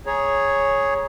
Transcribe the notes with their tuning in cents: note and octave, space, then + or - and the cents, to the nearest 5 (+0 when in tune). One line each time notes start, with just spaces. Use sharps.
G#4 +0 C#5 +0 A#5 +20